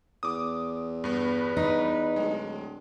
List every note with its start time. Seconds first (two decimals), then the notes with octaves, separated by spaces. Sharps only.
0.23 E2 D6 D#6
1.04 G2 B3 B4
1.57 D#4
2.16 D1 G#3